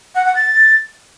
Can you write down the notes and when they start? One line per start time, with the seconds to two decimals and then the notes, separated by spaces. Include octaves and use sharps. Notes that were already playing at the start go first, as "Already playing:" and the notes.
0.15 F#5
0.25 F#5
0.36 A6